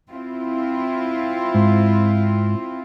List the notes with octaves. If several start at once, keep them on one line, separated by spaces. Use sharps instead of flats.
C4 E4 F4
G#2